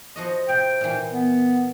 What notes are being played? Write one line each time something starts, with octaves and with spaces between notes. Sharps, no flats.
F3 F#4 D#5
C3 G5
A#2 E3
B3